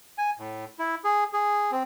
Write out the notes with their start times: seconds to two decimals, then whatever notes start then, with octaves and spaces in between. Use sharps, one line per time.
0.18 G#5
0.39 A2
0.79 E4
1.04 G#4
1.33 G#4
1.72 C4